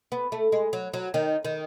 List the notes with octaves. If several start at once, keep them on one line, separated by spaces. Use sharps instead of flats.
B3
A3
G#3
F#3
F#3
D#3
D#3